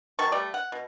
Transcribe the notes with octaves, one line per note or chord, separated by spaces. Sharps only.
D#3 F#3 A5 C#6
G3 A3 D5
F#5
B2